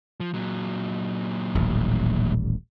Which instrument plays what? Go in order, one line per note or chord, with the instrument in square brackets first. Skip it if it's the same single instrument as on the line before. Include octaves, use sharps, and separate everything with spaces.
[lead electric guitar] F3
A#2 F#3
[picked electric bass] D#1 A1